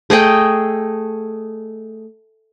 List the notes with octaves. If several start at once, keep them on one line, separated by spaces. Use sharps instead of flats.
A3 G#4 D#5 G5